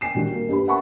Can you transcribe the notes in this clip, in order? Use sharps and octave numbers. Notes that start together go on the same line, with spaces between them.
G5 G#5 C7 E7
A#2 D#3 G3 D4 F#4
A#3
G2 G4 B4 B5
E5 F#5 G#5 A5 B5 C#6